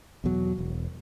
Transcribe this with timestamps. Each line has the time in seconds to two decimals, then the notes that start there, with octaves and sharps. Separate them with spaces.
0.24 E2 B2 F#3
0.58 E1